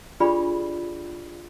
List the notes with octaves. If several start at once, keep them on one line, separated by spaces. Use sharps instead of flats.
D4 F4 G4 G#4 D5 B5